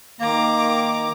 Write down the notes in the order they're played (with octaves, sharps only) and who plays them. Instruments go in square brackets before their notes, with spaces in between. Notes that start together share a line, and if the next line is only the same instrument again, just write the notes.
[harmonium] D#3 [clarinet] A#3 [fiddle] A#5 D6